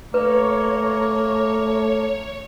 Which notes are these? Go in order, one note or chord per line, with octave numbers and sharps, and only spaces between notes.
A3 A#3 B4 C#5